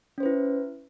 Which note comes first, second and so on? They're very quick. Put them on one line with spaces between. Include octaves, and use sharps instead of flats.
C#4 C5 B4 E4